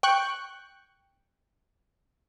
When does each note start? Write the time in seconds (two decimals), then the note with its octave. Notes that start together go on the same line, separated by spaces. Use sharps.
0.03 G5 C#6 F#6